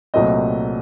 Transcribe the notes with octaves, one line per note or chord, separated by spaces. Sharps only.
C2 A#2 F#3 A3 C4 D#5